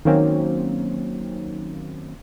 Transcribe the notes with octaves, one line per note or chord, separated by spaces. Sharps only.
D#3 F#3 A#3 C4 C#4